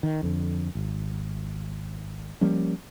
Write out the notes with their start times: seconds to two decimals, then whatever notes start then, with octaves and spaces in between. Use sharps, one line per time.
0.03 D#3
0.23 F2 D3
0.75 G#1
2.41 F3 G3 A#3 C#4